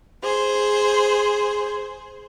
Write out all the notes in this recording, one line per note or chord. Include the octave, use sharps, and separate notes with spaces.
G#4 C5